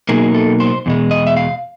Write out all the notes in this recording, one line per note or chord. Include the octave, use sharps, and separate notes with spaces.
B2 F#3 A#3 D#4 G#4
A4
C5
E2 B2 G#3
D#5
E5
F5